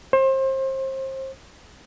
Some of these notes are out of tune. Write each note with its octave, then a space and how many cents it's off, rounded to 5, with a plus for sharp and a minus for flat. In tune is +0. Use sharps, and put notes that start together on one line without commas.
C5 +30